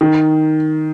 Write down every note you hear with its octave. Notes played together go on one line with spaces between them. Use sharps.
D#3